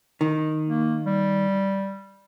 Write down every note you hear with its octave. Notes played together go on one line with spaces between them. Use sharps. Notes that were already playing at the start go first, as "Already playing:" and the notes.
D#3
A#3
G3